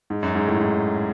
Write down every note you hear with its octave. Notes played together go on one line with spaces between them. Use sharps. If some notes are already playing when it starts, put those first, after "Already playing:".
G#2
F#2
G#2
A2
G#2